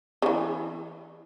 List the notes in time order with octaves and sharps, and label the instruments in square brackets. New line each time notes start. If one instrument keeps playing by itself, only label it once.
[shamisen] C#3 E3